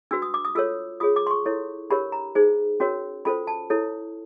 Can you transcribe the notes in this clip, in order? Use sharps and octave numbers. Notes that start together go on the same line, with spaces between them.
D4 F#4 B4 E6
D#6
D6
D#6
F4 A4 C#5 E6
F4 G#4 C#5 D#6
D6
C6
C#6
E4 A4 C#5
D4 G4 A#4 C#5 B5
A#5
D#4 G#4 C5
C#4 F#4 A#4 C#5
C#4 F4 A4 C5 B5
A5
E4 A4 C#5